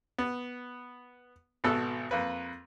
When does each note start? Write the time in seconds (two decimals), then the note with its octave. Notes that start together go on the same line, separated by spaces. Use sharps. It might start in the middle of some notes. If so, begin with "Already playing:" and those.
0.18 B3
1.64 G#1 B2 B3 A4 E6
2.11 F2 A#3 B4